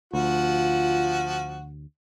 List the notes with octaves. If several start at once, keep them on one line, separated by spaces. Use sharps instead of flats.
D2 F3 F4 F#4